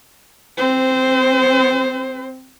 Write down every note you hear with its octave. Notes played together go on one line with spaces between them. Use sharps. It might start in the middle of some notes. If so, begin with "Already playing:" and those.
C4 C5